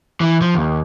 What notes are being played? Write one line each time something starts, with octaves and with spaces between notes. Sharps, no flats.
E3
F3
D#2